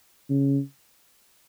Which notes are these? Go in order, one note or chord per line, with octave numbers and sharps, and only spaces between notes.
C#3